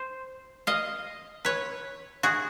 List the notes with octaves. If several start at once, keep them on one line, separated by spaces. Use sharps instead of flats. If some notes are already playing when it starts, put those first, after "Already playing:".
Already playing: C5
D#5 F5
B4 C#5
F#4 G#4